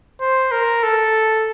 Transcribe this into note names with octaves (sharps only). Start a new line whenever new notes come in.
C5
A#4
A4